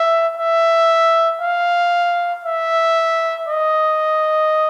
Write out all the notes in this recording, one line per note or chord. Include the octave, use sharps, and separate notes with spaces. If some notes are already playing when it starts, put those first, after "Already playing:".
Already playing: E5
E5
F5
E5
D#5